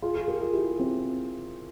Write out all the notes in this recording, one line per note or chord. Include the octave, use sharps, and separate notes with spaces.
F4 G#4
F4 G#4
G4 A#4
F4 G#4
E4 G4
C4 E4